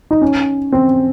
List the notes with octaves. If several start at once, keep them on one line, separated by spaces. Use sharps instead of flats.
D#4
C#4
C4